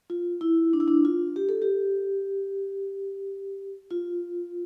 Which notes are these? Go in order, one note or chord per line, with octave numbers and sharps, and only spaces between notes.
F4
E4
D4
E4
D4
F4
G4
A4
G4
F4